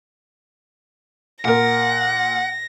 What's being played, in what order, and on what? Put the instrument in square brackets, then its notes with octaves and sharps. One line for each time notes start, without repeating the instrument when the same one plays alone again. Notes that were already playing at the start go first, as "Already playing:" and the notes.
[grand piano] A#2 A#4 [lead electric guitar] F#5 [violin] A#6